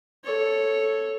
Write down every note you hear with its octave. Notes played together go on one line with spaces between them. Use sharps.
A4 C#5